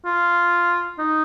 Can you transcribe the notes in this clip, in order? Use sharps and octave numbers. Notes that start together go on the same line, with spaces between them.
F4
D#4